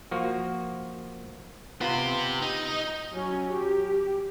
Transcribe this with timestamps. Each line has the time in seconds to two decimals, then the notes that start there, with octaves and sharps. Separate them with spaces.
0.11 F3 A#3 F#4
1.81 B3 F4 G4 C5
2.42 D#4
3.12 F#3 C#4
3.51 G4